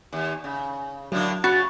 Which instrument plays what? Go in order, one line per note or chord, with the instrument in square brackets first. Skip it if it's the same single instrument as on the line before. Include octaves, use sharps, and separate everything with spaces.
[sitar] D#2
C#3
[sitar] A2 D3 A#3 [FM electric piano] F#3
[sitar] C#3 [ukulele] F#4 [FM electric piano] B5 C#6 A6